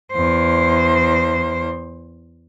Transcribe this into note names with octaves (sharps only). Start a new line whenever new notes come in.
E2 C5